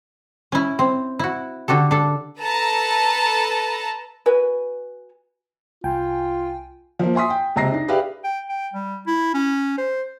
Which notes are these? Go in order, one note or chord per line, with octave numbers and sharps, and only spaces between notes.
C#4 E4
C4
E4 F#4
D3 F#4 G4 A4
D4 A4
A4 B4 A5 A#5
F#4 B4 G#5
C2 F4 G5 G#5
F3 A#3
E5 G#5 C6 D#6 B6
G5
C#2 C3 A#5 A#6 C7
D4 D#4
G4 G#4 B4 D5 E5 F5
G5
G5
G3
E4
C#4
C5